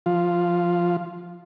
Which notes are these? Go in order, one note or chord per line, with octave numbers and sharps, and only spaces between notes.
F3 F4